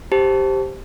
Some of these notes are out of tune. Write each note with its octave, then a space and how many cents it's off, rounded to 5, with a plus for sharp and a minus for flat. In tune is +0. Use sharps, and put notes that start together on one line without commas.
G4 +0 C5 +0 A5 +0